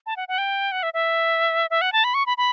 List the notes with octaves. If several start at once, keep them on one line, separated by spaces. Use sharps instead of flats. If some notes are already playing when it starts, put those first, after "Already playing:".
A5
F#5
F#5
G5
F#5
E5
E5
E5
F#5
A5
B5
C#6
B5
B5